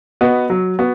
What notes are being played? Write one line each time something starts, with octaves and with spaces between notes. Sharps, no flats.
B3 F#4 B4 D#5
F#3
B3 F#4